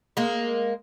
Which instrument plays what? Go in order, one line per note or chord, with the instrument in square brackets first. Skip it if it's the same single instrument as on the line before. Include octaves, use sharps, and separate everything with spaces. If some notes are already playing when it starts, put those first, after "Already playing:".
[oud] G#3 A#3